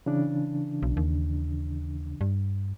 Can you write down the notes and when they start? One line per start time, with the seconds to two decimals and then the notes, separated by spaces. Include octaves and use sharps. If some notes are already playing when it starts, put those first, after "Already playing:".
0.06 C#3 E3 D4
0.83 B1
0.97 D#2
2.21 G2